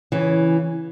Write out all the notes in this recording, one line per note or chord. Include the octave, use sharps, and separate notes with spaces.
C#3 E3